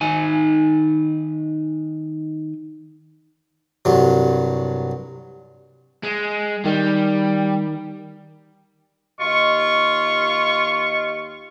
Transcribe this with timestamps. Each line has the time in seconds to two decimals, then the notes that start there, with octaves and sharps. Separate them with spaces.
0.01 D#3 D#4 G#5
3.85 C2 G2 F#3
6.03 G#3
6.65 D#3 G3
9.21 D#2 F4 G4 D#5 C#6